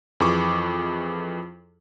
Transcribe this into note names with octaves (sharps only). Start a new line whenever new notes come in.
F2 E3 G#4 C#6 D6